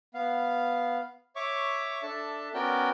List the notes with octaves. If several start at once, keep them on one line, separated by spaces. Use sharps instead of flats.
B3 F5
C#5 E5 C#6 D6
D4 A4 E5 A5
B3 C#4 F#4 A#4 D5 G5